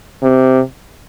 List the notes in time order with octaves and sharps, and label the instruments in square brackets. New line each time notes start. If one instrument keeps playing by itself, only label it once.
[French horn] C3